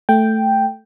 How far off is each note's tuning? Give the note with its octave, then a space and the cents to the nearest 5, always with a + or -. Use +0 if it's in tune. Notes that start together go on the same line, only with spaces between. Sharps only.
A3 +0 G5 +0